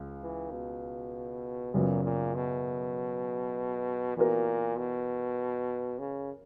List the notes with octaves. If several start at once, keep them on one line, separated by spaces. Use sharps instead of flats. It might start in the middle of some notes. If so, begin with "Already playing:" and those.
Already playing: C#2 C#3
E3
B2
F#2 A#2 C#3 F#3 B3
A#2
B2
A#2 E3 B3 F#4 A#4
B2
C#3